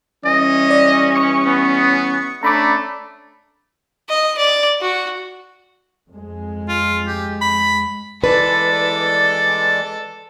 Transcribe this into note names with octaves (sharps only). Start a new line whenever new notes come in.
E3 G3 C#4 D#5
D5
C#6 D#6 C#7
B3
A3 C#4 D4 A#5 B5 D6
D#5
D5
F#4
F2 G#3
F4
G4
B5
E3 G#3 A4 B4 D5